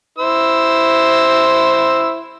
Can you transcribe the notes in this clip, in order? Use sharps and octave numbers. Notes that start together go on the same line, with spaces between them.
E4 C5 E6